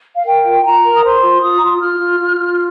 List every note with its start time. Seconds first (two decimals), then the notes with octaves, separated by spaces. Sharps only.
0.15 F5
0.25 A#4 G5
0.44 F4
0.63 F4 A#5
0.84 A#4
0.95 D#6
1.03 C5 C6
1.22 F4
1.42 F4 D#6
1.56 A#5
1.62 F4 C6
1.73 D#6
1.81 F4 F6
2.00 F4
2.20 F4
2.39 F4